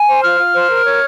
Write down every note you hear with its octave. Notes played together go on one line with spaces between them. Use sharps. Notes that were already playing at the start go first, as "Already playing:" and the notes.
Already playing: G#5
C5
F4 F6
F4
C5
A#4
C#5